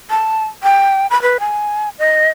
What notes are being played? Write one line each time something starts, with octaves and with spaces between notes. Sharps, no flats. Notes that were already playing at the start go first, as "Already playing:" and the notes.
A5
G5
B5
B4
G#5
D#5